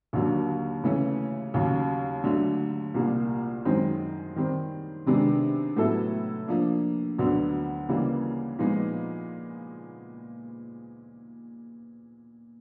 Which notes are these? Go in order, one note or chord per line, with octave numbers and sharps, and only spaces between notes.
D#2 D3 F#3 A#3
C#3 E3 A3 C#4
D#2 C#3 F#3
D3 F#3 A3
C2 A#2 G3 A#3
F#2 D#3 G#3 C4 D#4
D#3 G3 C4
C3 D#3 G#3 B3 D4
A2 F#3 B3 E4 A4
F3 A#3 D4
D2 D3 F#3 B3
C#3 E3 G3 A#3
A#2 F3 G#3 B3 D#4